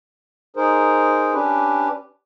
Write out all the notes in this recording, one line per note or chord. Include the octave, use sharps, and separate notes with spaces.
D#4 G#4 A#4 C5
C#4 D4 G4 B4